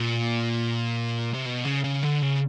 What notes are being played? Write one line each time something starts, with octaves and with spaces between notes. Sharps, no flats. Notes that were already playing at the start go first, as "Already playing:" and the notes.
Already playing: A#2
C3
B2
C#3
C#3
D3
C#3